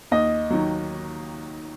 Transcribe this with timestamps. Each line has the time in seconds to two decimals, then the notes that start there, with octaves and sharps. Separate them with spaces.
0.11 D#2 D#5
0.50 D#3 F#3